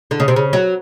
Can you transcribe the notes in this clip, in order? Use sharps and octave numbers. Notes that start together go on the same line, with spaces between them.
D3
C#3
C3
C#3
F#3